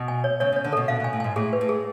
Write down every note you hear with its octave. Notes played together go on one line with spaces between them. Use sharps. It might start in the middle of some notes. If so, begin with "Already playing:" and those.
Already playing: B2
G#5
C#5
C#3 C#5
C#3
C#5
D3
B2 A4
B2 F5
B2
G#5
A2
G#2 G#5
A2 G#4
B4
A2
G#4